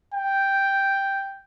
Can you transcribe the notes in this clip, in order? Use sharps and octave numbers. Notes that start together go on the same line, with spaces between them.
G5